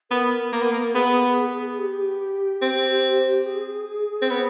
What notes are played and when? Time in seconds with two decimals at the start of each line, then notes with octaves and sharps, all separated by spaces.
0.10 B3 A#4
0.52 A#3
0.62 B3
0.71 A#3
0.94 B3 G#4
1.78 G4
2.62 C4
3.46 G#4
4.22 C4
4.31 B3